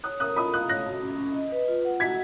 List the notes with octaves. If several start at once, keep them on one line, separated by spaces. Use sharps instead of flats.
C#5 D#6 F#6
A#4 D#6 F#6
F4 B5 D#6
F5 D#6 F#6
C#5 F#6 A#6
F#4
C#4
C#4
D#5
B4
F4
F#5
F#4 G#6 B6